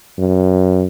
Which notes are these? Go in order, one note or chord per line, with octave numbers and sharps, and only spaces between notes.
F#2